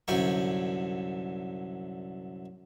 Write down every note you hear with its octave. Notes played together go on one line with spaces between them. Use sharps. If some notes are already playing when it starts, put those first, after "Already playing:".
C2 F#2 D3 G5 G#5 C#6